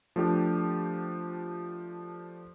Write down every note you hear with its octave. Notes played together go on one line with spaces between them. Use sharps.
F3 A3 D4 G4